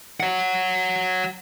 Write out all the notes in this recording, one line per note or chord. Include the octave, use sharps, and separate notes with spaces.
C#5 F#5